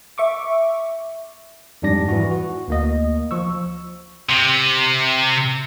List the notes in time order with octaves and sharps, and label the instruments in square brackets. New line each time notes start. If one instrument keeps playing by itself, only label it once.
[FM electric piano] E5 C#6 D6
[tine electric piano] F2 G#2 G3 D4 D5 A#6
E3 E4 F#4
F#4
D2 A#3 D#5
F3 C#6 E6
[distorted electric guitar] C3